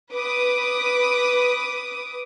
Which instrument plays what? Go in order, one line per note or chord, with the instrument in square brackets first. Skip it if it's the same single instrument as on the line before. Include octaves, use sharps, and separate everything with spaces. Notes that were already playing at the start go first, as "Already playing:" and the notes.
[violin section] B4 D6 D#6